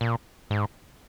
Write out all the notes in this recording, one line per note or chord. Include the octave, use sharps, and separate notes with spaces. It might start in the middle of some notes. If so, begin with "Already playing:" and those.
A#2
G#2